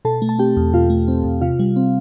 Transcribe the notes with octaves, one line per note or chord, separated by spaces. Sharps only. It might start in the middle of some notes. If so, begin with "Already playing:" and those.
B2 A4 A5
A3
A5
C4 G4 G5
E2
B2 F4 F5
A3
C4
E2
C3 F4 F5
G3
C4